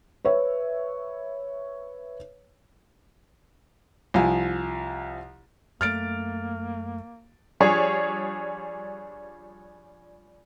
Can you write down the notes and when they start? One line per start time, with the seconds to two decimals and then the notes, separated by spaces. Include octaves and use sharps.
0.25 B4 C#5 E5
4.14 C2 F3 G#5
5.81 F#2 A3 A#3 F6 A6 D7
7.60 F3 G3 D4 G#4 C#5